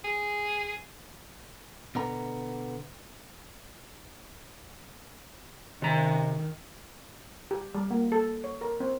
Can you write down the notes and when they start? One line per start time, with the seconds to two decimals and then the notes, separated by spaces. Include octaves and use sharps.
0.04 G#4
1.95 B2 D3 B3 A#5
5.82 C3 D#3 A#5
7.51 G4
7.75 G3
7.91 A#3
8.12 A4
8.44 C#5
8.61 A#4
8.80 C4